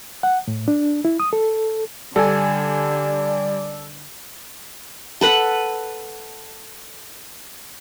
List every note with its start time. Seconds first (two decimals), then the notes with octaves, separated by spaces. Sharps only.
0.23 F#5
0.48 A2
0.68 D4
1.05 E4
1.20 D#6
1.33 A4
2.16 D3 G3 A4 D5 G#5
5.21 A4 B4 F#5 B5